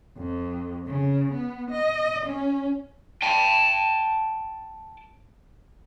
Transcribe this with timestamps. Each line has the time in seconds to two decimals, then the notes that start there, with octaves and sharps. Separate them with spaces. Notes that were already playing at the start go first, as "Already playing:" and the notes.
0.18 F2
0.87 C#3
1.32 B3
1.71 D#5
2.26 C#4
3.22 G5 A5